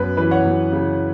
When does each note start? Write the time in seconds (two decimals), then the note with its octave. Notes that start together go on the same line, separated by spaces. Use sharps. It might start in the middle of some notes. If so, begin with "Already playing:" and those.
Already playing: F#2 B3 B4
0.17 E3 B4
0.31 C#5 F#5
0.44 F#2
0.72 C#3